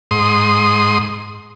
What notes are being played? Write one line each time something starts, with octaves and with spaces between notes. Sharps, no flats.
G#2 C6 D#6